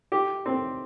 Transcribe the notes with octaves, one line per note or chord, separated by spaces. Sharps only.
G4
C4